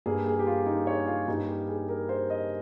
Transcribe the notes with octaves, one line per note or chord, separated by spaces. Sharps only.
G2 G3 A#3 G#4
G#4
G4
F4
D#4
C#5
F4
G2 G3 A#3 D#4
G4
G#4
A#4
C5
D#5